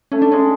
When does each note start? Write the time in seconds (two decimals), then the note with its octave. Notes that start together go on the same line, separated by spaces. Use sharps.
0.12 A3 C#4
0.22 D4
0.32 G#3 C#4